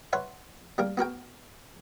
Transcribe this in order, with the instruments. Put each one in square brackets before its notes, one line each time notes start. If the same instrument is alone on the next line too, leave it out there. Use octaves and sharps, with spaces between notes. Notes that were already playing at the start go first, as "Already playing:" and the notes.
[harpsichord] B4 C#5 E5 F#5 C6
G3 A#3 G4 A#4
B3 F#4 A#4 G5